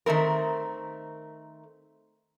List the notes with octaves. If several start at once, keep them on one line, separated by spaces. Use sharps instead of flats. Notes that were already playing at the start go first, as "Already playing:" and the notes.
D#3 A3 C4 A#4